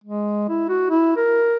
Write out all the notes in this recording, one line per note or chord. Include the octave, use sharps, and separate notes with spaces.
G#3
E4
F#4
E4
A#4